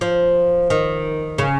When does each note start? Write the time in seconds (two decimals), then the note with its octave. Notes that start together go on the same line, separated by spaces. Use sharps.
0.01 F3
0.70 D#3
1.38 C#3